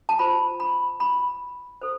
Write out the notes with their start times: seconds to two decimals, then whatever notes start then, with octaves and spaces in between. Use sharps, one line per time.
0.09 A5
0.19 F4 C5 B5
0.60 B5
1.00 B5
1.82 A4 C5